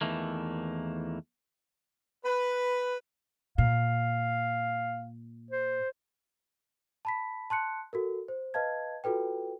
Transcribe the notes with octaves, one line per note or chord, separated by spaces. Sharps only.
E2 D#3 E3 A3 A#3
B4
A#2 F5
C5
A5 B5 B6
A5 C6 F#6 C#7
F#4 A4 A#4
C5
B4 D#5 F5 A5 G#6
F4 F#4 A4 B4 G5